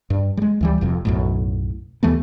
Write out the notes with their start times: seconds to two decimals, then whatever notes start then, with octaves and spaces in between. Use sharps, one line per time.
0.10 G2
0.37 G3 G#3
0.61 D2 E3 G3
0.81 F1 F2 C3
1.05 B1 F#2 A2
2.03 D#2 E3 A3 B3